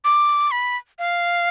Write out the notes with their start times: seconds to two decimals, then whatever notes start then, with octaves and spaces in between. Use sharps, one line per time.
0.04 D6
0.51 B5
0.99 F5